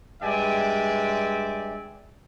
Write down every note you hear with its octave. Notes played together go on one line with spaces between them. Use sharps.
G2 G#3 D5 E5 G5 G#5